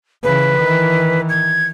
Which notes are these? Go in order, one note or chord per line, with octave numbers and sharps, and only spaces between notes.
C#3 E3 B4
D#3 E3
G#6